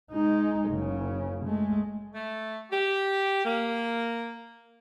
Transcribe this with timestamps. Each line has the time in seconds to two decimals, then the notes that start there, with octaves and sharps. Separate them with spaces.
0.11 G#3 D#4
0.70 F#1 C#3
1.45 G#3 A3
2.14 A3
2.71 G4
3.45 A#3